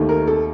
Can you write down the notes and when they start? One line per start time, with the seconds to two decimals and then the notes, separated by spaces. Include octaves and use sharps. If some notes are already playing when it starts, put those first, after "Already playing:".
Already playing: D#2 D#3 A3
0.09 A#4
0.27 A4